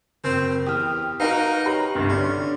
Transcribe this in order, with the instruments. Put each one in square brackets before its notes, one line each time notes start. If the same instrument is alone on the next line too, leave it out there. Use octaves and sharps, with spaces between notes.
[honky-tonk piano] F#1 [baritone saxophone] C4
[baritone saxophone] E2 [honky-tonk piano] G4 [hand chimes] D#6 F6
[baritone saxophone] D#4 [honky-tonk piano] F#4 A#4 F5 [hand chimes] B4
[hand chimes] G4 C#5 [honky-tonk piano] A#5
[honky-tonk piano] G1 C2 G2
[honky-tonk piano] D3 D5 [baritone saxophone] C#4